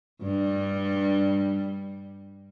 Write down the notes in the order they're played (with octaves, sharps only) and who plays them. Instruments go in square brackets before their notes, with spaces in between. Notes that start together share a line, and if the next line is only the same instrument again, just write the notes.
[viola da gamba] G2 G3